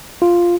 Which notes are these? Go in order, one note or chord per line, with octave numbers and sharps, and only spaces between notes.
F4